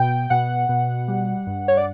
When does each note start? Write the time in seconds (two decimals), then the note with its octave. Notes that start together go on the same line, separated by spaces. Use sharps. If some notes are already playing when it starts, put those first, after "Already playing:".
Already playing: B2 G5
0.30 B2 F#5
0.69 B2
1.08 G3
1.47 G2
1.68 C#5
1.77 D5